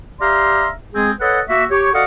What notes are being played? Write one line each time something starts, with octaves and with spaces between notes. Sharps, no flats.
G4 D5 E5 F5 A#5 C6
G#3 C4 G#4
A4 B4 C#5 D#5 F#5
A#3 F#4 E5
G4 C#5
F#4 A4 D5 D#5 F5 F#5